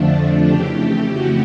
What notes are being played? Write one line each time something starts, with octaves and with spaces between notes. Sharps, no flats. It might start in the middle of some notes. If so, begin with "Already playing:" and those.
Already playing: F2 D3 F3 A3 D4
F2 C#3 E3 A3 G4
F#4